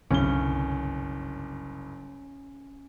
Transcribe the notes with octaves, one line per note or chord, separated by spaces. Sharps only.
F#1 C2 G2 D3 C#4 G7